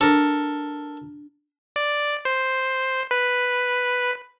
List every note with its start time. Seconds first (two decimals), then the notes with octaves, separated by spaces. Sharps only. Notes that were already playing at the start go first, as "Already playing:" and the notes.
0.01 D4 A4 A#4
1.76 D5
2.25 C5
3.11 B4